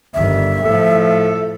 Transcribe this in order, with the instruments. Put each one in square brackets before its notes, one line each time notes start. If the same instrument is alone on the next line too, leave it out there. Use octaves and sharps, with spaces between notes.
[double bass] G1 D#3 [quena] E5
[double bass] A2 F3 [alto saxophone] A4